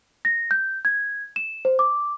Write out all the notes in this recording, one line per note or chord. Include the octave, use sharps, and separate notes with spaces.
A#6
G6
G#6
E7
C5
D6